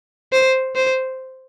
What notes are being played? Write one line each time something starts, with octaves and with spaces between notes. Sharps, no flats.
C5
C5